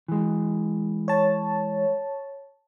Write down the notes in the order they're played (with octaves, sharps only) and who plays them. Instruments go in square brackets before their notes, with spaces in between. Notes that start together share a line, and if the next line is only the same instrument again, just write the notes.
[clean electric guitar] E3 G#3
[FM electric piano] C#5 A5